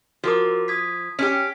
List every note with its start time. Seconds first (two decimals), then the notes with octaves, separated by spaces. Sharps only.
0.24 F3 F#4 A#4 D6
0.68 D#6 G#6 B6
1.19 C#4 G4 G5 B6